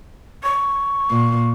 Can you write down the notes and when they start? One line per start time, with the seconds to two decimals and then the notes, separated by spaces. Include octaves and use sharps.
0.44 C#6
1.11 A#2